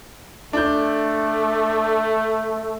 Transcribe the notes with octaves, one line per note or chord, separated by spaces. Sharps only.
A3 D4 G6